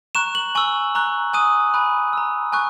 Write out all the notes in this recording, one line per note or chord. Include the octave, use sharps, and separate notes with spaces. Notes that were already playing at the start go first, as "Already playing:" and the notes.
A#5 C#6 F#6 E7
F#7
G#5 C#6 E6
A#5 C#6 F#6
G#5 D#6 F#6 D#7
G#5 B5 F#6
A#5 E6
G#5 C#6 F#6